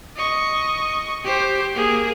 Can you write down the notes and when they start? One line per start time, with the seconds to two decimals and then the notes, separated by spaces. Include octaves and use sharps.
0.17 D#5 C#6
1.25 G4 C5
1.75 A#3 G#4